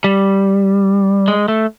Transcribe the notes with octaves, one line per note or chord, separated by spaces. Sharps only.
G3
G#3
A3